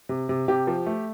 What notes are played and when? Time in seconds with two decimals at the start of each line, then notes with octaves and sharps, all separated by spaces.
0.09 C3
0.29 C3
0.48 C3 G4
0.67 F3
0.86 A3